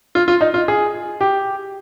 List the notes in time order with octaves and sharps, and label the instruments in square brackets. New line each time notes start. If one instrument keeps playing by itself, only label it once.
[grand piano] F4
F4
D#4
F4
G#4
G4